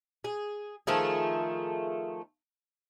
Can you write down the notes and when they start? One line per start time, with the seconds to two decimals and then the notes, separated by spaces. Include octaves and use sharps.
0.24 G#4
0.87 D#3 F3 A3 G#4